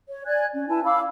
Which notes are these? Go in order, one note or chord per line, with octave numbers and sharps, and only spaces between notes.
C#5
D5 G#5 F#6 G#6
C#4
E4 B4 G#5 A5
F5 B5 D6 E6